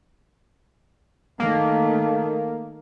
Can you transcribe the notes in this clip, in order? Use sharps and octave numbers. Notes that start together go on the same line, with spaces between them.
D#3 A3 A#3